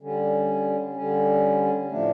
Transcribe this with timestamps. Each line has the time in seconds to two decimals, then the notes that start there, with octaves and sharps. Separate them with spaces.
0.01 D3 G3 C#4
0.94 D3 G3 C#4
1.89 A2 F3 A3 D4